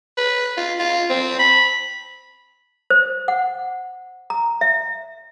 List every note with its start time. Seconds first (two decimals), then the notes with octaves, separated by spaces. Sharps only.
0.18 B4
0.57 F4
0.79 F4
1.10 C4
1.39 B5
2.90 C5
3.28 F#5
4.30 A#5
4.61 E5